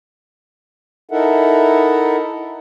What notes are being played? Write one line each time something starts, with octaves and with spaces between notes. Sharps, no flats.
D#4 E4 A4 A#4 E5 F#5